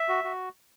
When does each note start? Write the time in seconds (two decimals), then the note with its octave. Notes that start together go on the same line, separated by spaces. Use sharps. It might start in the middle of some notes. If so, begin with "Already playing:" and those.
Already playing: E5
0.09 F#4
0.24 F#4